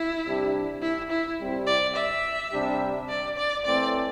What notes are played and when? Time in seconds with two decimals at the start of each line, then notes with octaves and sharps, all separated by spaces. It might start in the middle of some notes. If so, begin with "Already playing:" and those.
Already playing: E4
0.25 C3 G3 D4 G4
0.82 E4
1.10 E4
1.39 C2 C3 G3 C4
1.67 D5
1.96 E5
2.52 C3 G3 D4 G4
3.09 D5
3.37 D5
3.65 A2 E3 A3 C4 D5